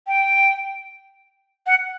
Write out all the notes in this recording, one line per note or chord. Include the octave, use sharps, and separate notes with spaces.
G5
F#5